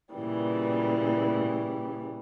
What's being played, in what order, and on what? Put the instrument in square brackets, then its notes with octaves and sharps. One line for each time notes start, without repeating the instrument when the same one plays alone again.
[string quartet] A#2 C#3 E3 G3